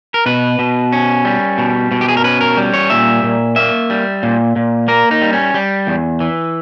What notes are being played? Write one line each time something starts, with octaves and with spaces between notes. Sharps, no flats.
A#4
B2 B4
B2
C#4
G3
B2
B2
G4
G#4
A#4
C#4 B4
A#4
G3
C#5
A#2 E5
A#2
A#3 E5
G3
A#2
A#2
A#3 A#4
D#4
G3
C#4
G3
E2
E3